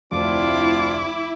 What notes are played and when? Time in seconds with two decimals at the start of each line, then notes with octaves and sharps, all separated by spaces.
0.12 F1 D2 C4 D4 E4 F4 D6